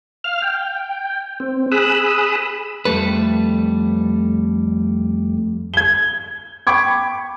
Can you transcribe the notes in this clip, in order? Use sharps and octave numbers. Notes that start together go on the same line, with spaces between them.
F5 F6
G5
C4
G#4 B5 D#6 E6 F#6
F2 G3 A3 A4 B4
G#6 G7
G5 B5 C#6 D6 G#6